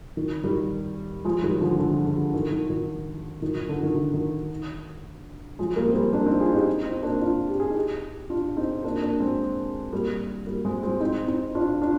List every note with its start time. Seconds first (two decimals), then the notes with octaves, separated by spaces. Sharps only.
0.17 D#3
0.44 D#3 G3
1.25 F3 G#3
1.42 D#3 G3
1.61 D3 F3
1.79 D3 F3
2.06 D3
2.34 D#3
2.51 D#3
2.70 D#3
3.42 D#3
3.55 D#3
3.69 D3
3.83 D#3
3.96 D3
4.14 D#3
5.59 F3 G#3
5.76 G3 A#3
5.88 C4
5.95 G3 A#3
6.13 A#3 D4
6.26 C4 D#4
6.39 F4 G#4
6.53 D#4 G4
6.85 C4 D#4
7.03 A#3 D4
7.21 D4 F4
7.48 G4
7.60 G#4
7.70 D#4 G4
8.30 D4 F4
8.57 C4 D#4
8.84 A#3 D4
9.02 A#3 D4
9.20 G#3 C4
9.92 G3 A#3
10.47 G3 A#3
10.65 G#3 C4
10.82 G#3 C4
11.00 C4 D#4
11.28 C4 D#4
11.55 D4 F4
11.82 D4 F4